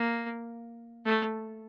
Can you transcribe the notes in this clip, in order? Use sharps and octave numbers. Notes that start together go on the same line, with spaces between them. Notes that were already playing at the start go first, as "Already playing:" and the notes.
Already playing: A#3
A3